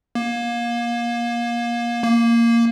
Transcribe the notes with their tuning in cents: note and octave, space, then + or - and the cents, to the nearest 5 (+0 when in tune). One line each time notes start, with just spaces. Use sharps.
A#3 +25
A#3 -5